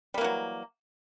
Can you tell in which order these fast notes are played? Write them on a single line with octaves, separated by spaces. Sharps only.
G3 A#3 E3 F#3